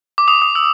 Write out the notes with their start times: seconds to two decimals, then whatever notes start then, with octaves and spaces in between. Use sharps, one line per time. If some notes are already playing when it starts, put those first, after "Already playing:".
0.18 D6
0.28 D#6
0.42 D#6
0.55 E6